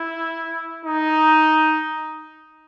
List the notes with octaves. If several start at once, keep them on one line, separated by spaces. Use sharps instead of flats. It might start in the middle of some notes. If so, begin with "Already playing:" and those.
Already playing: E4
D#4